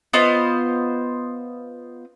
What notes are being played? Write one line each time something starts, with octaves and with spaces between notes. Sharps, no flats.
B3 F4 C5 D#5